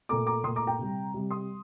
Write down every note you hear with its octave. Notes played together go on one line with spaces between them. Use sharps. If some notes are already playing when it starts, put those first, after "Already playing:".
A#2 A3 A#5 D6
A#5 D6
A#2 A3 C6 D#6
A#5 D6
G5 A#5
C3 G3
C3 G3
C6 D#6